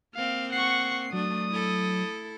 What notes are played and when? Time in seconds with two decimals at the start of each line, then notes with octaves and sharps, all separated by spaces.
0.15 A#3 C4 F5
0.52 F#5 C#6 C7
1.13 F#3 A3 D4 D#6
1.51 E4 A4